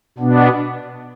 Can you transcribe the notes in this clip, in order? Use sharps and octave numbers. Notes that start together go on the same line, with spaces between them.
B2 B3 D4